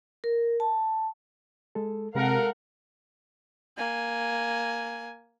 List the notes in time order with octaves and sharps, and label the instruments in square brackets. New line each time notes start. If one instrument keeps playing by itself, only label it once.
[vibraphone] A#4
A5
[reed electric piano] G#3 A4
[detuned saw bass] C3 [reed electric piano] G#3 [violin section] A4 F5 F#5 [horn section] A#4
[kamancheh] A#3 G#5